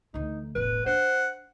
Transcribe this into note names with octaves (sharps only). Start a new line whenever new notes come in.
D2 E3 D#4
E1 A1 B4
D4 C5 F#5